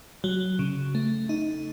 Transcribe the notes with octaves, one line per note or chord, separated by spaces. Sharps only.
F#3
C#3
A3
D#4